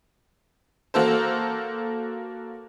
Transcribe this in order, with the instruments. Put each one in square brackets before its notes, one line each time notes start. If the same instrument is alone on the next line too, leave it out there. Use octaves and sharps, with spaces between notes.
[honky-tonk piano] A#3 F#4 A4 C5